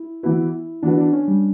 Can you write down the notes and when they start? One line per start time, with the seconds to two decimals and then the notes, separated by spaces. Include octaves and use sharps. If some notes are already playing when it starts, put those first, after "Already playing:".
Already playing: E4
0.23 E3 B3 E4 F#4 B4
0.83 E3 B3 D4 F#4 B4
0.98 D4
1.13 C#4
1.28 G3